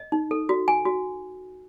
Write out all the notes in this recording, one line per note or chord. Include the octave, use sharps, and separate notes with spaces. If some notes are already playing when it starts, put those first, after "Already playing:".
Already playing: D#5
D#4
A4
F#4
G#5
F#4